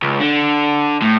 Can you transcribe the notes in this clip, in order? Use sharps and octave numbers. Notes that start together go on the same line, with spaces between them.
C#2
D3
A2